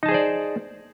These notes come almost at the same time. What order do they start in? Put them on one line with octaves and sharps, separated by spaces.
D#4 A5 G#4 C5 D5